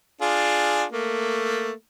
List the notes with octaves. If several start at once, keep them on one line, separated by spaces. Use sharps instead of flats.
D4 F4 G#4
A3 A#3